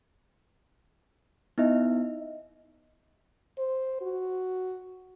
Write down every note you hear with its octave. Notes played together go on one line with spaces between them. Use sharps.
B3 D#4 E4 D#5 E5
C5
F#4